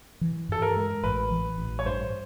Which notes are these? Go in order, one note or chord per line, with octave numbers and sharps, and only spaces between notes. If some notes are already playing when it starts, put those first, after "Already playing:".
E3
G2 A4
A#4
G#3
A1 B4
E3
A1
C#5
G2 C5